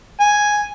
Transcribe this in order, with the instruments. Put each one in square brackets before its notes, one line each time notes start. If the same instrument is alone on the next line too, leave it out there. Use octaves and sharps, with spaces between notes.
[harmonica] G#5